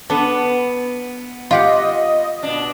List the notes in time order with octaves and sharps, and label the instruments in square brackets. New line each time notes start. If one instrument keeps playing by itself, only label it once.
[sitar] B3 [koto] D4 A4
[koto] F4 G4 F#5 [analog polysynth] D#5
[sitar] B2 D4